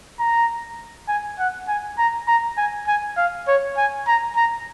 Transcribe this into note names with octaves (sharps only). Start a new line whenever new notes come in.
A#5
G#5
F#5
G#5
A#5
A#5
G#5
G#5
F5
C#5
G#5
A#5
A#5